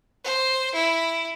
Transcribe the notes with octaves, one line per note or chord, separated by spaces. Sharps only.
C5
E4